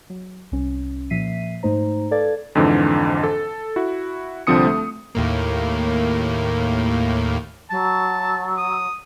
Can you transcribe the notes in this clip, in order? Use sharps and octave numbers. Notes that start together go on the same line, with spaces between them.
F#3
C2 C#4
A#2 F3 E5 B6 C7 D#7
G#2 A3 D#4 C5 A#5
A4 B4 D5 F5 G#6 A6
F2 G#2 D3 E3
A4
E4 F#4
C2 D3 F3 C4 D#6 C#7
A3
D#2 A2 A#3
F#3 A5
D#6